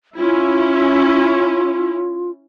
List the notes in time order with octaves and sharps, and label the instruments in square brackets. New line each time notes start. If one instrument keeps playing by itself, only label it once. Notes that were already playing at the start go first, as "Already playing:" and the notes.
[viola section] C#4 E4 [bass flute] F4